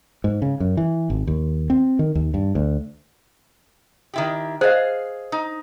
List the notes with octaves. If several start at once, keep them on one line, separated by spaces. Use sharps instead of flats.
G#2
C#3
F#2
E3
G#1
D#2
C4
D#3
D#2
G2
D2
D#3 E4 G4
G#4 C5 D#5 F5
D#4